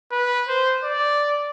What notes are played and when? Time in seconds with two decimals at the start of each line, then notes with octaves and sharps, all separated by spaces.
0.11 B4
0.48 C5
0.84 D5